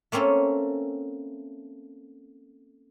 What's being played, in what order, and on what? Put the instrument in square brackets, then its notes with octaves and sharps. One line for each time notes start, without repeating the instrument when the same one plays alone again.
[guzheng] A3 A#3 C4 C#4 A4